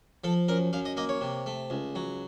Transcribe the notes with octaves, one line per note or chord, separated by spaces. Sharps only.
F3 A4
F#2 A#4
F#2 F5
D#5
A#3 D#5
C#5
C3
A3
C#2
F#3